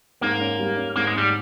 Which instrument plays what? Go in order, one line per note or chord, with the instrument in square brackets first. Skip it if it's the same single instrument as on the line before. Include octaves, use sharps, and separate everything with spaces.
[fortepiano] G#2 [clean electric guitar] A#3
[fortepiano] C#4
G3
C#4
[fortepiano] G#2 [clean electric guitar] A#3
[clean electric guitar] G#3
[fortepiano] G#2 [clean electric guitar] G3